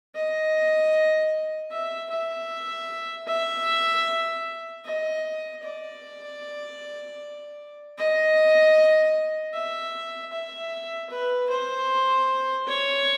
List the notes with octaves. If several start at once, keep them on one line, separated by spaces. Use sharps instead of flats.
D#5
E5
E5
E5
D#5
D5
D#5
E5
E5
B4
C5
C#5